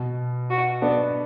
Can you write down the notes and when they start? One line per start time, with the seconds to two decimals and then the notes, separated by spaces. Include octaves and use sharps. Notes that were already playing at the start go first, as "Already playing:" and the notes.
Already playing: B2
0.50 F#4
0.82 B3 D4